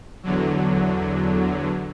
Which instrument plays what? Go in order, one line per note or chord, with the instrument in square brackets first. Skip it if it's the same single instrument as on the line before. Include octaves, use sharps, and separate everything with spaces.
[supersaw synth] E2 D3 F#3